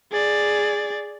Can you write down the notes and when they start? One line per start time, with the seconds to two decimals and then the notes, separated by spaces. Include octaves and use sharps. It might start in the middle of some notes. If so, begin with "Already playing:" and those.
0.12 G#4 D5